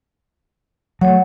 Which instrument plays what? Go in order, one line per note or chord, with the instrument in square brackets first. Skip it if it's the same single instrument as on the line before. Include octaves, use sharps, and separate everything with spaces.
[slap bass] F#3 G3 A3 [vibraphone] C#5 F#5